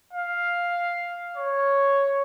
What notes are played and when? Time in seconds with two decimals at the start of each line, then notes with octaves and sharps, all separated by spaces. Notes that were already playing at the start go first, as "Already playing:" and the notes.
0.13 F5
1.36 C#5